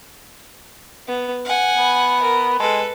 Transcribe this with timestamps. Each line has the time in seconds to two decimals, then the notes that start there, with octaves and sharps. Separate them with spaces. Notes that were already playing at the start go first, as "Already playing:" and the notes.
1.07 B3
1.45 F#5 G#5
1.77 B3
2.22 A#4
2.60 G#3 A4 B4